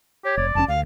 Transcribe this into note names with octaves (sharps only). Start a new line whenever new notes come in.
G4 C#5
F1 D5
F1 F2 C#4 A5
D2 F5